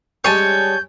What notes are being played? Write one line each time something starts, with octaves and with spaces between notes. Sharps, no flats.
G3 G#3 C#4 C#5 G#5 A5 G6